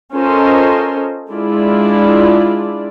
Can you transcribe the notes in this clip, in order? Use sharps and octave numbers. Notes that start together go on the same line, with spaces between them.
C#4 F4 A4 A#4 C5 D#5
G#3 D4 E4 F4 D5